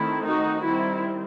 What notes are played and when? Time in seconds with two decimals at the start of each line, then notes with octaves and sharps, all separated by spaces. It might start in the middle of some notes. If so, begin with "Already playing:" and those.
Already playing: D#3 A3 C4 E4
0.25 D#4 F#4
0.63 D#3 G3 C4 E4